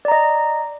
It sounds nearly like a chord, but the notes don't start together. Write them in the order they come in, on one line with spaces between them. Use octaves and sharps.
D5 A#5 D#5